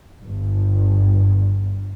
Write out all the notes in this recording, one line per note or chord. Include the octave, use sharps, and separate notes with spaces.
G1 G2